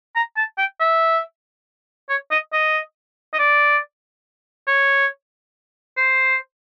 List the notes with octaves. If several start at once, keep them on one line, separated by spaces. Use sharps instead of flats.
A#5
A5
G5
E5
C#5
D#5
D#5
D#5
D5
C#5
C5